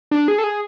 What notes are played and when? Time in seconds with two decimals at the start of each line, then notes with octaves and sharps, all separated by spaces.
0.11 D4
0.28 G#4
0.38 A4
0.44 G#4